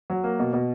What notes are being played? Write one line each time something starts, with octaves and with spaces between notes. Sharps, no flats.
F#3
A#3
B2
B2